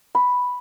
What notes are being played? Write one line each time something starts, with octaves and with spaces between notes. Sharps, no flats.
B5